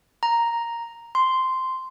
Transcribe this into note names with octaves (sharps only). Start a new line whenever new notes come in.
A#5
C6